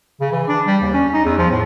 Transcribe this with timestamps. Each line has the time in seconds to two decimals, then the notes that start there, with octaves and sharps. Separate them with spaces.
0.21 C#3
0.32 E3
0.48 D4
0.67 G3
0.82 D#2
0.93 C#4
1.13 D#4
1.25 E2
1.39 F3
1.51 A2